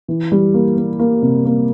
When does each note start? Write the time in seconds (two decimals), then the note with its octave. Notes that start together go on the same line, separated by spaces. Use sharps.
0.08 E3
0.32 G3
0.54 A#3
0.77 A#3
0.99 A#3
1.22 C3
1.45 A#3